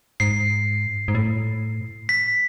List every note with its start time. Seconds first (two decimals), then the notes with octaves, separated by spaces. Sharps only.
0.20 G#2 C7
1.08 G#2
1.15 A2
2.09 B6